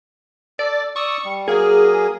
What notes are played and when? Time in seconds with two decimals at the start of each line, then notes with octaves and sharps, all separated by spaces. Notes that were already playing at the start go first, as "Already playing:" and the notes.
0.59 A4 D5
0.96 D5 C#6 D#6 E6
1.25 G3
1.48 F#3 A#3 G#4 A#4